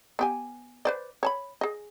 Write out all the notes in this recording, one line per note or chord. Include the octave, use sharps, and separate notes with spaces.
B3 G4 G#5
B4 C5 D5
C#5 A5 B5
G#4 D#5